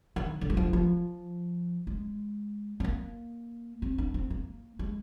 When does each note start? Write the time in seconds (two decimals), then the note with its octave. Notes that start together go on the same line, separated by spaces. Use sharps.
0.16 D#3
0.41 D3
0.50 G3
0.57 F3
0.73 F3
1.87 G#3
2.80 C4
2.84 A#3
3.82 C4
3.98 D4
4.14 C4
4.30 A#3
4.79 G#3